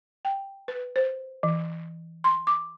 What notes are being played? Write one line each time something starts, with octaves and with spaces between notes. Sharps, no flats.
G5
B4
C5
E3
C6
D6